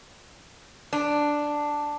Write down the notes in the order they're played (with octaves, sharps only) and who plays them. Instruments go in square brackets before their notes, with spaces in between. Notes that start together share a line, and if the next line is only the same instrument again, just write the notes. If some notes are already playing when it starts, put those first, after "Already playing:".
[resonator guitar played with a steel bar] D4